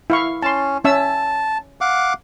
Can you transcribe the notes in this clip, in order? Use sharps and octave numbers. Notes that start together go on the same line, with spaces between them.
E4 F5 C#6
C#4 A5 C6
C#4 E5 A5 E6
F5 F#5 D6